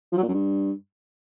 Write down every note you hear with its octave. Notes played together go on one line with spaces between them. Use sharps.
F3
F#3
A#2
F#2
G2